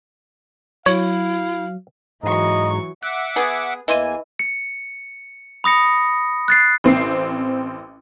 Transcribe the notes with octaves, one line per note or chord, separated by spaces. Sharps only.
F#3 E4 C#5 F5
G#2 E3 F#3 D#5 A#5 C#6
E5 F#5 D6 F#6
B3 G#4
E2 E3 A#3 D#5 G#5 C6 D#7
C#7
B5 D#6 A#6 C#7
F#6 A6 C7
A1 C4 C7